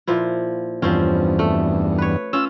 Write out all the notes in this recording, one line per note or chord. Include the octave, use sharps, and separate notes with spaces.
A#2 F3 E4
E2 G2 F3 C4 C#4
A3
B4 C#5
C#4 F4 E6